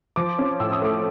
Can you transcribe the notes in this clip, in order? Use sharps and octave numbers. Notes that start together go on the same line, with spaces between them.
F3 D6
C#4
A2 E6
D#6
A3 D6